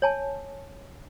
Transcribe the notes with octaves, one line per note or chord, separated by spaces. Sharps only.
C#5 G#5 A5